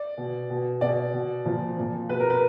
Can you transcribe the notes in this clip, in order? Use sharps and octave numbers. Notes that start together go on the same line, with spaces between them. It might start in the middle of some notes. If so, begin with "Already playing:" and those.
Already playing: D5
B2
B2
B2 D5
B2
A#2 F3
A#2 F3
B2 B4
A#4
B4